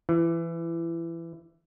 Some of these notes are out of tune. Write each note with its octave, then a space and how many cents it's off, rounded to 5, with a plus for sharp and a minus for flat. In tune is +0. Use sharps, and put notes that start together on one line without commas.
E3 +20